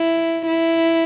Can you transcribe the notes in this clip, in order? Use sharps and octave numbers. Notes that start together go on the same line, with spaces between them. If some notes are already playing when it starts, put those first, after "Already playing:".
Already playing: E4
E4